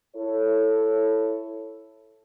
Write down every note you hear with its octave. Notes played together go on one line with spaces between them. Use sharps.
E4 A4 C#5